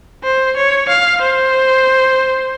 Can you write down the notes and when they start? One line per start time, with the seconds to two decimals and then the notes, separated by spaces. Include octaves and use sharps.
0.24 C5
0.57 C#5
0.89 F5
1.21 C5